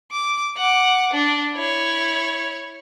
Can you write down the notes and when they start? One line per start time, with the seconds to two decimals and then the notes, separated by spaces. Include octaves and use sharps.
0.12 D6
0.58 F#5 D6
1.13 D4
1.55 E4 C#5